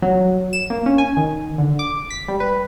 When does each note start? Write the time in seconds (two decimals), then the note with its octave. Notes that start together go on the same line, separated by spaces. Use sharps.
0.02 F#3
0.53 E7
0.70 A#3
0.86 C#4
0.98 G#5
1.17 D#3
1.58 D3
1.79 D6
2.10 B6
2.28 G3
2.40 B4